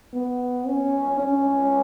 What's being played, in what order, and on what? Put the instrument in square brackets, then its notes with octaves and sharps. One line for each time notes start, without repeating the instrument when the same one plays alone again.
[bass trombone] B3
C#4
C#4